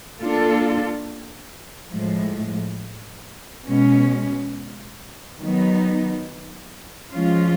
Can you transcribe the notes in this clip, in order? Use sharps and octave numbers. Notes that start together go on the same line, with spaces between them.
A#3 D4 F4 A4
A2 F3 G#3
B2 G#3 C#4
D#3 F#3 B3 D#4
F3 G#3 C#4 F4